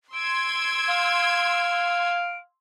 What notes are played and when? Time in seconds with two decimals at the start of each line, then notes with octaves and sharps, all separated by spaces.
0.14 C6 E6 G#6 D7
0.89 F5